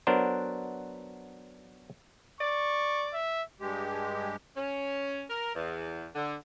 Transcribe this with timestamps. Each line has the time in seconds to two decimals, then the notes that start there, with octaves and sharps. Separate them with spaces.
0.07 F#3 B3 D4 A#4 C5
2.40 D5 C#6
3.14 E5
3.60 G2 G#3 G4
4.56 C#4
5.30 A#4
5.55 E2
6.15 D3